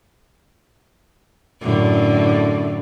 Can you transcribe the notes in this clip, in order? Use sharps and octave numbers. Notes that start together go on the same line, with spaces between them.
F#2 A2 D3